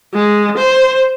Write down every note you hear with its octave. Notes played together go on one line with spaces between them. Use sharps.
G#3
C5